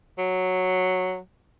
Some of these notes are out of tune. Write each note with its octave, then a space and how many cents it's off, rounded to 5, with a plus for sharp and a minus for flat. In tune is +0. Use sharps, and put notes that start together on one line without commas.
F#3 -5